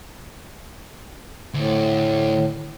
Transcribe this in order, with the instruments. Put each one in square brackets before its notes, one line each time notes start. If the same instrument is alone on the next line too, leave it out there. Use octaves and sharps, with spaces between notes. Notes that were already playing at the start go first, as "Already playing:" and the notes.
[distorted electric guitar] D2 [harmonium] A2